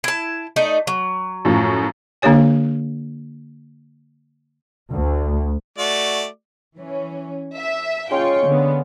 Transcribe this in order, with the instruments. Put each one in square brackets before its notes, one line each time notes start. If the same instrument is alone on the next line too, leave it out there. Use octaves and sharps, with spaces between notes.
[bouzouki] E4 A5
A3 D#4 D5
F#3
[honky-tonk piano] F#2 A2 F3
[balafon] D3 A#3 D4 G4 C#5 G#5
[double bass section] D2
[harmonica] A3 F#4 D5
[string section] E3 C#4
E5
[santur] G#3 C#4 F5 [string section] F4 G5 C#6
[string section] D3 B3